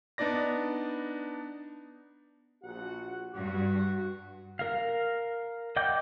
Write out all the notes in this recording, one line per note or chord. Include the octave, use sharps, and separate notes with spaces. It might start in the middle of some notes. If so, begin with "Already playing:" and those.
B3 D4 D#4 D5 A#6
A#1 F#4 F#5
G2 F#4
A#4 F5
D#5 F#5 G5 D6 G6